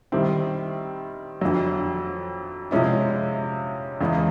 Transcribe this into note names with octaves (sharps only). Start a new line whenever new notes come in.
D#3 G3 C4 E4
F2 D3 F#3
C3 F3 G#3 C#4 E4
E2 C#3 E3 G#3